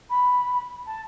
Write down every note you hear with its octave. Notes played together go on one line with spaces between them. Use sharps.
B5
A5